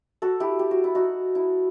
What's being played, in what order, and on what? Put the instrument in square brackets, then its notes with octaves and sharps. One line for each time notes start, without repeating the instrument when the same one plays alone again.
[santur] F#4 A4
E4 G4
G4
F#4
E4
D#4 F#4
E4